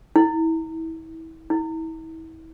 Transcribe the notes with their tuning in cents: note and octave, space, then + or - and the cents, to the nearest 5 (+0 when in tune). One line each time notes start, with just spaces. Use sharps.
E4 -30
E4 -35